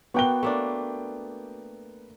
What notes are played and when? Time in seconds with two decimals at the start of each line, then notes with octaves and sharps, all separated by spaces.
0.14 A#3 B3 F#4 G5 G7
0.43 A3 A#3 D4